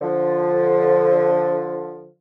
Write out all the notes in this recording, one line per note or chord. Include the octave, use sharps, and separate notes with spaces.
D3 F3